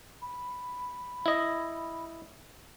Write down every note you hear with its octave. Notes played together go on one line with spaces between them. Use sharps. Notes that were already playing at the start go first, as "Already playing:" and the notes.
B5
E4 D#5